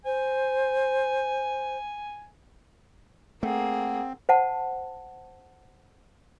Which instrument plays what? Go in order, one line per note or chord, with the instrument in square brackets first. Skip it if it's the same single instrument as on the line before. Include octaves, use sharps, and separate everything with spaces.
[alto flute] C5 [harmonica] G#5
[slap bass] A3 [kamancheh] A#3 G#4 [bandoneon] C4 [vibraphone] F#5
[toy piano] C5 F#5 A5